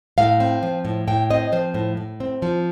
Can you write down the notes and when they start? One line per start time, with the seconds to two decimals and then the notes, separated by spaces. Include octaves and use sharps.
0.18 A2 F5
0.40 C4
0.63 F3
0.85 A2
1.07 A2 G5
1.30 C4 D#5
1.52 F3 C5
1.74 A2
1.97 A2
2.20 C4
2.42 F3